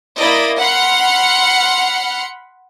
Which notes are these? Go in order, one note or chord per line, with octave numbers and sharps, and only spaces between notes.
A#3 E4 D5 D#5
F#5 B5 C6 F6 C#7